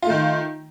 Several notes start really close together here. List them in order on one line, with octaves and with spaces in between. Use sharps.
F4 A3 D#3